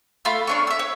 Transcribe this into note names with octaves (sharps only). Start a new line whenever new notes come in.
A3 F4 B5
C#4 D4 C#6
E5 E6
C#5